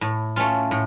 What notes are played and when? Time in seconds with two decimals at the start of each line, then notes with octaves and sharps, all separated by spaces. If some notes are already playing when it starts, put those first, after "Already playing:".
0.01 A2
0.36 A3 C#4 F4
0.71 A2